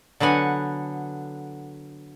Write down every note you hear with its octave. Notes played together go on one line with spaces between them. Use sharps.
D3 F#3 B3 F#5 G#5